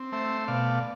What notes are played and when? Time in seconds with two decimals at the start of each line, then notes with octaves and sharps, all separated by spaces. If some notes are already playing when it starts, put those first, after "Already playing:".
Already playing: C4
0.12 A3 C5 E5
0.48 B2 D5 F5